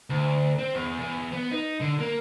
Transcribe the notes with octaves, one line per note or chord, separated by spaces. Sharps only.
D2
C4
E2
E2
B3
D#4
D3
A#3